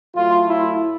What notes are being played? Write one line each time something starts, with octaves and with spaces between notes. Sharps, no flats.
A2 F#3 A3 F4
E4